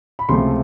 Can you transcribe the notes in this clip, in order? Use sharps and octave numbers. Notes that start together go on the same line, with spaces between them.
B5
C#2 C3 F3 A3 C6